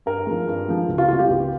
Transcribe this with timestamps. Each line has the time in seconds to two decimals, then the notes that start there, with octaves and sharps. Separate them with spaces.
0.06 G2 A#4
0.27 F3 G#3
0.48 G2
0.68 F3 G#3
0.89 C#2
0.98 F4
1.08 C3 G3 A#3 F4
1.19 G4
1.30 C#2